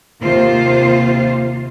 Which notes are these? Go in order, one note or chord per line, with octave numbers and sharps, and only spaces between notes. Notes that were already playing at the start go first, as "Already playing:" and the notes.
D#2 C3 F4 C5